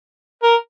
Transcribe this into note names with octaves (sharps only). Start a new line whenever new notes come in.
A#4